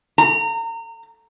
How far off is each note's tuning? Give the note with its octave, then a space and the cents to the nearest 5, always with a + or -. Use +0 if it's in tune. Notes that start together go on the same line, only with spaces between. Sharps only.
A#5 -30